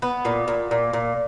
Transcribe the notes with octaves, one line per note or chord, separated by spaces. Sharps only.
B3
A#2
A#2
A#2
A#2